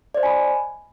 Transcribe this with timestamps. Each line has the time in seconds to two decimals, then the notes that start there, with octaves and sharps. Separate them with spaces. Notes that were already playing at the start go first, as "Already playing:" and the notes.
0.14 D5
0.17 C5
0.20 D#5
0.23 G#5
0.26 B5